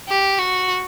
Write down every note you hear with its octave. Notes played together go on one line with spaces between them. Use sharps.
G4
F#4